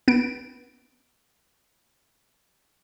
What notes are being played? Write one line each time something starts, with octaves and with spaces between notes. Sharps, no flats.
B3 D7